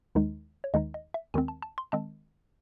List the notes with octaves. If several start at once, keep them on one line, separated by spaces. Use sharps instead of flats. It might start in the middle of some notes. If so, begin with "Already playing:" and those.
D#2 D#3 G#3 D#4
C#5
D#2 D#3 G#3 D#4 D#5
D#5
E5
D#2 D#3 G#3 C4 G#5
A5
A5
C6
D#3 G#3 C4 A5